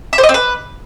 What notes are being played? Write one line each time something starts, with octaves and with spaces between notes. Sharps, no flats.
E5
C5
D#5
C4
B4